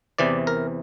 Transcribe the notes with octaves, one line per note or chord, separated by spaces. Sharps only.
E2 C3 E3 D5
A#4